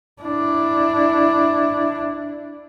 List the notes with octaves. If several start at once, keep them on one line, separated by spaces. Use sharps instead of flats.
D4 E4